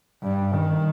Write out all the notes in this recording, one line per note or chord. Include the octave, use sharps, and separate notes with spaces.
G2
D#3